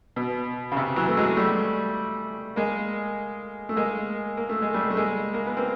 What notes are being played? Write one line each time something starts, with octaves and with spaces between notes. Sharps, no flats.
B2
C#3
C3
E3 F#3
A3
F#3 G#3
G3 A3
G#3 A#3
A3
G#3 A#3
A#3
A3
G#3
G3 A3
A3
G#3 A#3
A#3
B3
A#3 C4